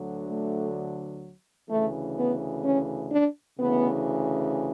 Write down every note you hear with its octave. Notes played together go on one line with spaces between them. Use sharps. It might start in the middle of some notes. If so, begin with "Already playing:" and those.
Already playing: D2 D3 F#3
A3
D2 C#3 E3 A3
B3
C#4
D4
D2 C#3 E3 B3